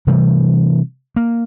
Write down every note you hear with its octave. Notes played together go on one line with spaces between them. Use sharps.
C3 E3 G3 A3
A#3